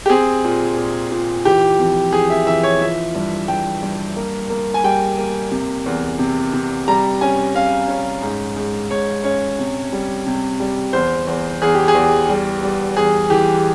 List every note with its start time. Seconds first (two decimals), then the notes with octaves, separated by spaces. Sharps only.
0.06 G4
0.10 C4 G#4
0.44 A#2
0.77 A#2
1.11 A#2
1.45 E3 G4
1.79 F2
2.13 E3 G#4
2.30 E5
2.47 E3 E5
2.63 C#5
2.81 F3 E5
3.15 G2
3.48 G2 G5
3.83 G2
4.16 A#3
4.50 A#3
4.74 G#5
4.84 G3 G5
5.18 A#3
5.51 C3
5.86 E2
6.19 C3
6.53 C3
6.88 G3 A#5
7.21 C#4 G#5
7.55 C#4 F5
7.88 C#4
8.23 G#2
8.56 G#2
8.91 G#2 C#5
9.24 C#4 C#5
9.59 C3
9.93 G3
10.26 C3
10.60 G3
10.93 E2 C5
11.27 E2
11.62 E2 G#4
11.74 G4
11.88 G#4
11.95 E2
12.29 G3
12.63 G3
12.97 E2 G#4
13.30 E3 G4